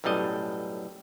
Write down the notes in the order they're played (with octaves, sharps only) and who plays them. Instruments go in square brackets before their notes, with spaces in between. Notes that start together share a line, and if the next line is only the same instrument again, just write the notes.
[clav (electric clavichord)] B1 F#2 A2 G3 D#5